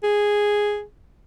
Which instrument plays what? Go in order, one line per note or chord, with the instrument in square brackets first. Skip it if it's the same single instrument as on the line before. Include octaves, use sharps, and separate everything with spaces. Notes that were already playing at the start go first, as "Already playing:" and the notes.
[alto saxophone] G#4